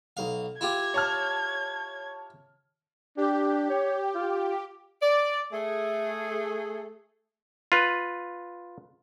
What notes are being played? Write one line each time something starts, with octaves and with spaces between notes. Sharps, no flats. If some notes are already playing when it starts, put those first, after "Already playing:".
B1 F5
E4 F4 G4 G#6
C#5 A5 F6
D4 G4
C#5
F4
D5
A3 G#4
F4 B4